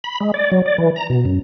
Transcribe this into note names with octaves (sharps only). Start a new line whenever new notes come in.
B5
G#3
D5
F#3
D5
E3
A#5
B2
F#2